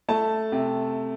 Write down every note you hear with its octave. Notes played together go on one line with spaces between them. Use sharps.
A3 A5
C3